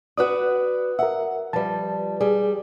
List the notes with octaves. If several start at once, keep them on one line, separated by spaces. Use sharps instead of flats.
F#4 B4 D5 D#6 F#6
A#4 E5 F#5
F3 G3 B4 A5
G3 G#4